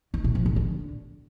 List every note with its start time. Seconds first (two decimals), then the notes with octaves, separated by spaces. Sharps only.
0.14 D#3
0.24 A#2
0.35 F3
0.46 A2
0.56 D3